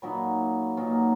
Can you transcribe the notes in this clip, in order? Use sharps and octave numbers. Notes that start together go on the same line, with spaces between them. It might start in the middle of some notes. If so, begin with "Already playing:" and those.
A#2 F#3 A#3 D#4 B5
A#2 F#3 A#3 D#4